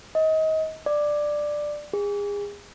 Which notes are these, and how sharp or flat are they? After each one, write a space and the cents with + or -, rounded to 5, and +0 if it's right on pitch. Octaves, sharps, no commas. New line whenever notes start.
D#5 +25
D5 +10
G#4 -30